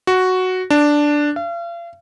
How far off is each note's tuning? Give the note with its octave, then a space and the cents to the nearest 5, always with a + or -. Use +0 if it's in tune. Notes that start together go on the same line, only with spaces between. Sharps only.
F#4 +0
D4 +0
F5 -40